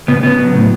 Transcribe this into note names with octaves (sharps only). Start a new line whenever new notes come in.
C#3 B3
C#3 B3
F#3
A2